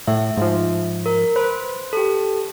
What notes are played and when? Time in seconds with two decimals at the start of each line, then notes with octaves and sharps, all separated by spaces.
0.07 A2 E5
0.37 G#2 F3
1.06 A#4
1.36 B4 C5
1.93 G4 A4